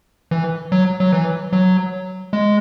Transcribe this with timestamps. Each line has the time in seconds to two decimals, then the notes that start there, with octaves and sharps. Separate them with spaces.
0.31 E3
0.72 F#3
1.00 F#3
1.12 E3
1.53 F#3
2.33 G#3